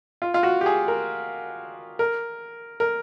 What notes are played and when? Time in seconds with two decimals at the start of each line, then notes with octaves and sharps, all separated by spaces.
0.22 F4
0.34 F4
0.43 F#4
0.61 G4
0.66 G#4
0.88 A#4
1.99 A#4
2.80 A#4